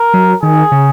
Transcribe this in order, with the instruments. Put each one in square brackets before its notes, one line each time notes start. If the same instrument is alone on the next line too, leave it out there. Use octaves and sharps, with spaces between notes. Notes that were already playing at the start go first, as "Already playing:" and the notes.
Already playing: [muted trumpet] A#4
[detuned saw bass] F#3
[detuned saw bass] D#3 [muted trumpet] G#4
[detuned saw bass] C#3